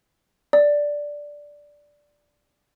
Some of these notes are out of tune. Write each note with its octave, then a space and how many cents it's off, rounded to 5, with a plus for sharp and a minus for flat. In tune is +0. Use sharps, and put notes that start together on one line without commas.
D5 -5